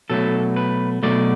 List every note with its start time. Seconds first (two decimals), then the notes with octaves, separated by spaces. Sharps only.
0.10 B2 F#3 A3 A4
0.56 B4
1.03 B2 F#3 A3 D5